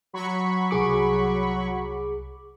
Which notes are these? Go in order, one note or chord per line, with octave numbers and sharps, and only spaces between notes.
F#3 B5 C#6
C2 G#4 D6